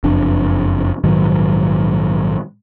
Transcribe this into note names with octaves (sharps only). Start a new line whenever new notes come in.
F#1 F2 D4
A#1 G#2 D#3 F#3